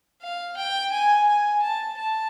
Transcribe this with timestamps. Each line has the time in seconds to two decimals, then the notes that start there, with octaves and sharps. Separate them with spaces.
0.22 F5
0.57 G5
0.92 G#5
1.28 G#5
1.63 A5
1.98 A5